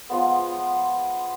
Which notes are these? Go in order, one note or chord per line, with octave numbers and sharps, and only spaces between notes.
F3 G#3 B3